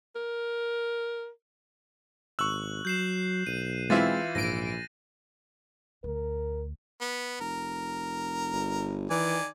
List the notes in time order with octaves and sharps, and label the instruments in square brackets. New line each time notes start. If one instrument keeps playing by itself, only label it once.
[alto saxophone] A#4
[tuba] G#1 [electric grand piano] C#6 E6 [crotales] F#6 F#7
[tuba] F#3 [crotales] G6 C7 E7
[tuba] B1 [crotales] D#7
[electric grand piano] E3 F4 E5 [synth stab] G#3 C4 E4 [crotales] A6
[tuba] A#1 [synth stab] G#2 D7 [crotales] A#6 D#7
[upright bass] D2 [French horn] A#4
[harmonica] B3
[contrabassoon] F1 [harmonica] A#4
[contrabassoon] G1
[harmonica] D#3 D5 G#5 [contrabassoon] E3